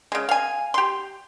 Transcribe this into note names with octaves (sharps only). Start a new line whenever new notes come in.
C#3 G#3
F5 G#5
G4 C6